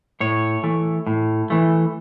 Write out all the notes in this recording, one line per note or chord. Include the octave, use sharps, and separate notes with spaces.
A2 C#5
E3 A3
A2
E3 A3